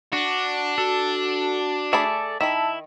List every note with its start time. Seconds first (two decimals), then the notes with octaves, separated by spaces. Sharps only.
0.13 D4 F#4
0.78 F#4 A4
1.93 A3 G#4 A4 D5 E5 B5
2.41 D#3 E4 E5 A5 B5